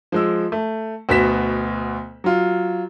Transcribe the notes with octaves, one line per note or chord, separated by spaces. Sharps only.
F3 G#3 E6
A3
D2 B2 B3 B6 E7
F#3 F4